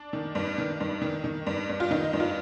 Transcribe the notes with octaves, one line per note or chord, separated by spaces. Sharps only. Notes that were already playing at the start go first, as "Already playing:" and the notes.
Already playing: D4
D#3
G2
D#3
G2
D#3
D#3
G2
G2
F4
D#3 D#4
G2
F4